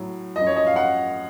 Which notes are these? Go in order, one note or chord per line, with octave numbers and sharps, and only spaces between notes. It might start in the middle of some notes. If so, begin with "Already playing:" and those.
Already playing: A2 F#3
F#2 F3 D#5
C#5
D#5
F5
F#5